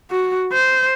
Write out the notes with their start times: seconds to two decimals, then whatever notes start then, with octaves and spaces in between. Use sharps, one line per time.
0.11 F#4
0.53 C5